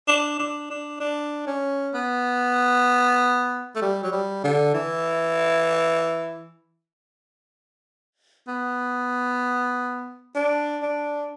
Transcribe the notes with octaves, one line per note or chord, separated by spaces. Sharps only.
D4
D4
D4
D4
C#4
B3
A3
G3
F#3
G3
D3
E3
B3
D4
D4